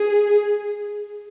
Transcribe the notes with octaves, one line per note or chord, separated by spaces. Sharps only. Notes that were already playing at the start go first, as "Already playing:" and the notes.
Already playing: G#4